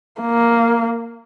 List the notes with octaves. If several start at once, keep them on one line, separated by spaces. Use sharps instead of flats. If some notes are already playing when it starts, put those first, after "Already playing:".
A#3